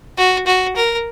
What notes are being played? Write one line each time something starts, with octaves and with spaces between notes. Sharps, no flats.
F#4
F#4
A#4